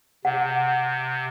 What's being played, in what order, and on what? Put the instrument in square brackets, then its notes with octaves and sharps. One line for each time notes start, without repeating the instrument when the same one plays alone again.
[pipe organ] C3 [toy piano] F#5